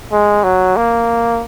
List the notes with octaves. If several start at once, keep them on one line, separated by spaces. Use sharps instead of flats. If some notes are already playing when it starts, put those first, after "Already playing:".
G#3
F#3
A#3